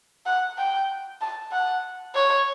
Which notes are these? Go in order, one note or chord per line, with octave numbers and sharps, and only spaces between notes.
F#5
G5
A5
F#5
C#5